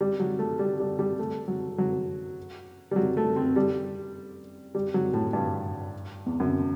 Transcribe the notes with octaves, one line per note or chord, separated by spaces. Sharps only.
G3
F#3
A3
G3
G3
G3
A3
F#3
F#3
G3
F#3
A3
C4
G3
G3
F#3
A2
G2
E2
F#2